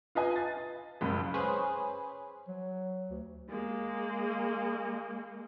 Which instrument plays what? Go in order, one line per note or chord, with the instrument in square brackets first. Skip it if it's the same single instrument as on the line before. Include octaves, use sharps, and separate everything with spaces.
[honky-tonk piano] F4 B4 D#5 G#5
A6
F#1 C#2 B5
[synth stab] C#4 G#4 B4 C5
[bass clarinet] F#3
D2
[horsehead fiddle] G#3 A#3